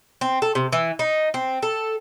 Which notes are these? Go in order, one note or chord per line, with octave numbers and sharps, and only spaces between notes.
C4
A4
C3
E3
D#4
C4
A4